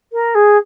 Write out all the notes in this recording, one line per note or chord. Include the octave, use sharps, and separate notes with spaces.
A#4
G#4